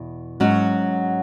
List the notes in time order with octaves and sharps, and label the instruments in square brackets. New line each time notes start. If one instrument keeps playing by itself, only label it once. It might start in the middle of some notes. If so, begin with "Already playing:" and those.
Already playing: [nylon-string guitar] E2 B2
G#2 F#3 C#4 F#4